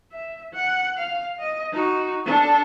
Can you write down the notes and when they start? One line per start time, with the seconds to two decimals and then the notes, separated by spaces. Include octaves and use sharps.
0.12 E5
0.53 F#5
0.97 F5
1.39 D#5
1.72 D#4 F#4
2.25 D4 A4